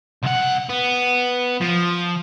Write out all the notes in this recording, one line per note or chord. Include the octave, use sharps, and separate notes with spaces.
C2 F#5
B3
F3